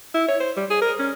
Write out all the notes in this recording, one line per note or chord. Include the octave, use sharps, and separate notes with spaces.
E4
C#5
C5
G3
G#4
A#4
C#4